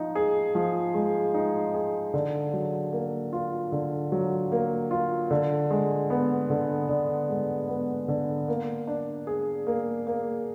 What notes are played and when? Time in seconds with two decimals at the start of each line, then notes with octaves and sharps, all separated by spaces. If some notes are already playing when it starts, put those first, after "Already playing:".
Already playing: F3 D#4
0.15 G#4
0.55 F3
0.94 G#3
1.34 D#4
1.74 G#4
2.14 D3
2.53 F#3
2.93 A#3
3.33 F4
3.72 D3
4.12 F#3
4.52 A#3
4.91 F4
5.31 D3
5.71 G#3
6.10 B3
6.50 D3
6.89 D3
7.29 G#3
7.69 B3
8.08 D3
8.48 A#3
8.87 D4
9.27 G#4
9.67 A#3
10.07 A#3